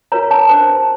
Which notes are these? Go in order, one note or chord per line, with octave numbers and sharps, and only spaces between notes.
F#4 A#4 C#5 A#5
A5
D4 G4 C5